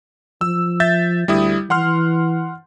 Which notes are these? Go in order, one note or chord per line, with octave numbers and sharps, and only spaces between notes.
F3 E6
E5 G6 A6
D2 G3 E4 D#6
E3 F#5 C6 F6